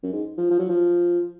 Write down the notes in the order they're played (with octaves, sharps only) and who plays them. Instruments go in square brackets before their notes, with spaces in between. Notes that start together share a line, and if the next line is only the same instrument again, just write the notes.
[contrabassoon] F#2
G#2
F3
F3
F#3
F3